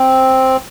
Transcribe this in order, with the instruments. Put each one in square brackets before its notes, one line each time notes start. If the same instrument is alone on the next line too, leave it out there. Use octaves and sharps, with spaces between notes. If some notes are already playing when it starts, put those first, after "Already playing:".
Already playing: [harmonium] C4